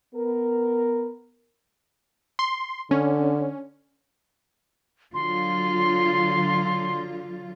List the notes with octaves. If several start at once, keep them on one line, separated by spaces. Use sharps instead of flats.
B3 A#4
C6
D3 C#4
D3 F#3 F4 C6